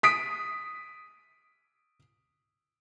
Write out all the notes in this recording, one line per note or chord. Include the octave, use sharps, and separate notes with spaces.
D#6 B6 D7